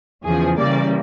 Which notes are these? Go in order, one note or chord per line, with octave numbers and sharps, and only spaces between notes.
E2 C#3 F3 G#4
C#3 E3 G3 A#3 D5